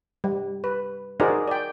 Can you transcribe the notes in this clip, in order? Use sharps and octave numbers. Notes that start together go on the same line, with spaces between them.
G3
B4
D#4 F#4 G#4 A#4 C5 D5
D5 G5